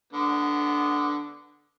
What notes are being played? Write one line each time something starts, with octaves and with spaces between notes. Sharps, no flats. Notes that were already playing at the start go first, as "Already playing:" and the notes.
D3 B3